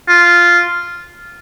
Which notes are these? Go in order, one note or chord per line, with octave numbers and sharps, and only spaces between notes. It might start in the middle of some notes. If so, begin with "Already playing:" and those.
F4